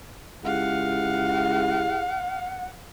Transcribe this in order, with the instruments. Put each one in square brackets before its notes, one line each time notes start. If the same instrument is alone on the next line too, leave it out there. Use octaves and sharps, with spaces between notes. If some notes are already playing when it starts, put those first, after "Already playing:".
[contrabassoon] C#2 [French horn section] E4 G4 G#4 [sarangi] F5 [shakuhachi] F#5